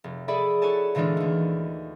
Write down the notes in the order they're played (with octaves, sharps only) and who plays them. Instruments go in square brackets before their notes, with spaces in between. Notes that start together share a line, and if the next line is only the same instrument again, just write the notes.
[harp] F1
G#4 A4 D5 E5 B5 D#6
E4 F#4 A4 C#5 G#5 A5
A#2 D3 E3 G#3 D4 F4
D#2 A3